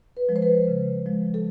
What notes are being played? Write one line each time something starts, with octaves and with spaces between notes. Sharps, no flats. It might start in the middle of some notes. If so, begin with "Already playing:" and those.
B4
F3 G#3
C5
B4
C#3
F3 G#3
A4